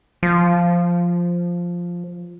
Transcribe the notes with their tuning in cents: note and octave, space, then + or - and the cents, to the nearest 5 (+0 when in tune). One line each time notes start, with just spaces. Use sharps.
F3 +0